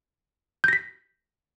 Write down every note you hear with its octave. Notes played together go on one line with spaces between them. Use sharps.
G6 A#6 B6